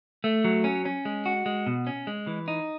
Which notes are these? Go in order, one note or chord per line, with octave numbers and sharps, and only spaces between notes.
A3
F#3
C#4
C#4
G#3
F#4
G#3
B2
C#4
G#3
E3
D#4